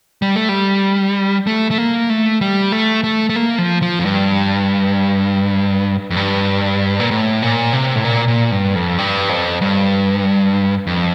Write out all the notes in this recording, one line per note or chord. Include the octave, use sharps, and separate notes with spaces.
G3
A3
G3
A3
A3
A#3
A3
G3
A3
A3
A3
A#3
F3
F3
F2
G2
F2
G2
A#2
A2
A#2
C3
A2
A#2
A#2
G2
F2
G2
F2
G2
F2